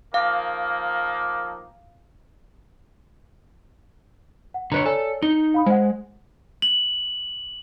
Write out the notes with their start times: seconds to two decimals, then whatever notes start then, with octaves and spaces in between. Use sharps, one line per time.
0.14 D#3 F3 A#3 F5
4.54 F#5
4.72 D3 B4 C#5 A#5
4.86 A4 C#5 D5 G#5
5.22 D#4 G7
5.54 F5 B5 D#6
5.66 G#3 C5 F#5
6.62 F#7